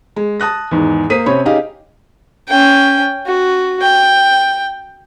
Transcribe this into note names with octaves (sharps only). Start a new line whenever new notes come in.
G#3
A5 D#6 F#6 A#6
E2 G#2 D#3
A#3 C5 D#6 B6 D#7
C3 C4 C#4 C#5 B5
C#4 D#4 G4 G#4 D#5 F5
C#4 G5
F#4
G5